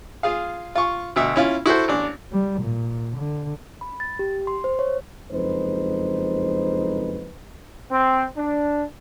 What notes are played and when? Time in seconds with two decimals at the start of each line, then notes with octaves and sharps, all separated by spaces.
0.23 F4 G#4 F5
0.75 F4 C#6
1.16 D2 B2 E5
1.36 C#4 E4 F4
1.66 E4 F#4 A4 C5
1.88 A1 D4
2.32 G3
2.62 A#2
3.17 D3
3.81 B5
4.00 A6
4.19 G4
4.47 C6
4.64 C5
4.79 C#5
5.30 F#1 F2 G#3 D#4 B4 C5
7.91 C4
8.37 D4